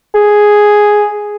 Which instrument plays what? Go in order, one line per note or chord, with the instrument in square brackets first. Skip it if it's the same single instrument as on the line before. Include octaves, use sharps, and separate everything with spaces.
[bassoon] G#4